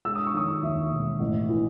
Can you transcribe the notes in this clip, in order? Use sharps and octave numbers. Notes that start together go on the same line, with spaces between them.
G#3 E6
D#6
C#6
D#3 D#6
D#2 E5
E1
A1
E3